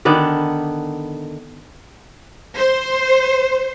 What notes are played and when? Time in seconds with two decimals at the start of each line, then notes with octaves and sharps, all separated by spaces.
0.05 D3 D#3 B3 D4
2.56 C5